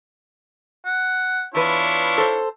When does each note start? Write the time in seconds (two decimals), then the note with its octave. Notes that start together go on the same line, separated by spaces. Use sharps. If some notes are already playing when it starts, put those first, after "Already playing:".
0.86 F#5
1.55 E2 D4 E4 F4 B4 C#5
2.18 A4 C5